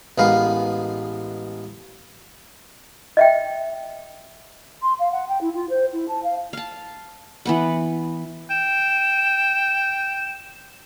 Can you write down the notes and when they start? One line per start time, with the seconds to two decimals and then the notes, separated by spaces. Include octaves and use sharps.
0.18 A1 G#3 B3 A#4 F5
3.17 D#5 E5 G5
4.82 C6
4.99 F5
5.12 F#5
5.28 G5
5.41 E4
5.55 F4
5.69 C5
5.93 E4
6.08 A5
6.23 F5
6.53 F5 A5
7.45 E3 B3 F#5
8.50 G5 E7